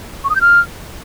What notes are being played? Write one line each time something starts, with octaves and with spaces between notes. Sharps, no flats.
C#6
D#6
G6
F6